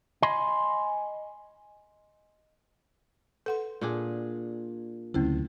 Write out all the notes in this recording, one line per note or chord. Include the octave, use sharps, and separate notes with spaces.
D#5 G#5 B5 C6
A4 B4 F#5 C6
A#2 D4 G#4
D2 C#3 F#3 A3 C4 C#4 E4